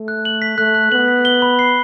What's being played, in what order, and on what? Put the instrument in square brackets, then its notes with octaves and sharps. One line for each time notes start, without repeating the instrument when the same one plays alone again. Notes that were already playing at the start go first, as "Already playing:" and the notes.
Already playing: [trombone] A3
[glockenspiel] F#6
F#7
B6
[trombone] A3 [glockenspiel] F#6
[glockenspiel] F#6
[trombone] B3 [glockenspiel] F#7
[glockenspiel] B6
G7
B5
C7